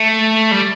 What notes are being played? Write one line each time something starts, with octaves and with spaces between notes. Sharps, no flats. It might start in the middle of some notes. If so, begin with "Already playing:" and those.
Already playing: A3
G3